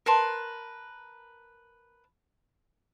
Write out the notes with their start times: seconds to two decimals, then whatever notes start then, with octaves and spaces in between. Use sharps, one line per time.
0.06 A#4 B4 A5 C6